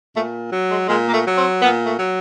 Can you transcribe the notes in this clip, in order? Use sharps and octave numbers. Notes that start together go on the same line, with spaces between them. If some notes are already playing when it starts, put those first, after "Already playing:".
A#2 A3
F#3
G#3
A#2 G#3
A#3
A3
F#3
C4
A#2 B3
A3
F#3